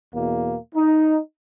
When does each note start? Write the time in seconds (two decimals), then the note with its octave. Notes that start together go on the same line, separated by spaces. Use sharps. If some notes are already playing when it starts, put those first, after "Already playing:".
0.13 E2 B2 A#3
0.74 D#4